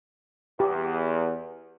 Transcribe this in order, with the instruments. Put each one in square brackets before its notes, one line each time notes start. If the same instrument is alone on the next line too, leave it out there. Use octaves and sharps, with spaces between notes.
[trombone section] E2 [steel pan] G4